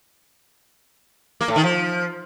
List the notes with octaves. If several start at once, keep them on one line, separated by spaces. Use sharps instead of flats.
A#3
A2
D#3
F3